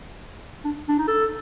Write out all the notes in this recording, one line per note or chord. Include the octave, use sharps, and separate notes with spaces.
D4
D4
D#4
A4